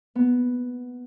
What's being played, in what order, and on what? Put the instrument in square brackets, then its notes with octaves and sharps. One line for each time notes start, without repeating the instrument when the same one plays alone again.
[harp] B3